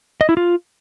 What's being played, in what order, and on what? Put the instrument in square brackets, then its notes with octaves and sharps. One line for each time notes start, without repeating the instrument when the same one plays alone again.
[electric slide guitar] D#5
E4
F4